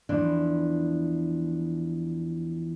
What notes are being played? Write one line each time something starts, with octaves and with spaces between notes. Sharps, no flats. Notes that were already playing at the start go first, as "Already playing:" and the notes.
E2 E3 F3 D4